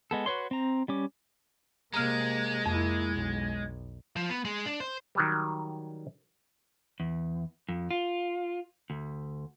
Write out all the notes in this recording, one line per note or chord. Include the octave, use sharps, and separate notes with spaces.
G#3 B3 A4
F#4 B4 C#5 C6
C4 A#5
G3 C#4 D6
C3 G#3 A#3 A#5 F6
F2 A#3 E4
B1
F3
B3
G#3
D4
C5
D#3 F#3 G3
E2
F2
F4
D2